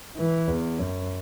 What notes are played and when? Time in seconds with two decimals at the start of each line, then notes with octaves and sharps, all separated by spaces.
0.17 E3
0.48 E2
0.78 F#2